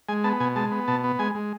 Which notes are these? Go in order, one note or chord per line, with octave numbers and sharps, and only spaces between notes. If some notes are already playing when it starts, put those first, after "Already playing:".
G#3 G#5
B3 A5
B2 G#5
G#3 A5
B3
B2 A5
B3
G#3 G#5
G#3